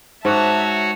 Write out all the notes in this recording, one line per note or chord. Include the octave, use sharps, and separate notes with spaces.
G#2 F#4 C#5 E5 A5 A#5